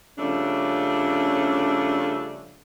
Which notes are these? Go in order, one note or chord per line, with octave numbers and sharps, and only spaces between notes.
C#3 F3 G3 A3 C#4 D4